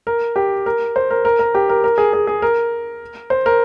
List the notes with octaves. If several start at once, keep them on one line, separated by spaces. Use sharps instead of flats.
A#4
G4
A#4
C5
A#4
A#4
A#4
G4
A#4
A#4
G#4
G#4
G#4
A#4
C5
A#4